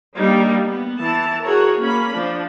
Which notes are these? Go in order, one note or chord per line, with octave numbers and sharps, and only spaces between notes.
G3 A#3 D4 D#4
B3
E3 A5
F#4 G#4 A#4 C#5
A#3 C#4 B5
F3 D4